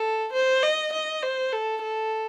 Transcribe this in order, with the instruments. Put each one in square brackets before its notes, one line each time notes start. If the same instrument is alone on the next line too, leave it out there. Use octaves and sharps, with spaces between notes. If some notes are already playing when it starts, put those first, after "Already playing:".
Already playing: [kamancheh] A4
C5
D#5
D#5
C5
A4
A4